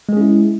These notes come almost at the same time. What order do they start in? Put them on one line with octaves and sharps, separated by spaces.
G#3 G#4 C#4 E4